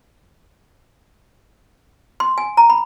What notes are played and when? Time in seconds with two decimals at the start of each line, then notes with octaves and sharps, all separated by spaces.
2.20 C6
2.38 G#5
2.57 A#5
2.70 B5